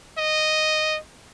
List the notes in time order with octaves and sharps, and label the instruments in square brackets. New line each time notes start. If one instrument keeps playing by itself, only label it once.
[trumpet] D#5